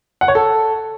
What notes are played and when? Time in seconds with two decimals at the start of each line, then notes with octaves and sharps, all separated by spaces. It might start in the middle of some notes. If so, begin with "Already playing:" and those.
0.21 F#5
0.28 C#5
0.35 A4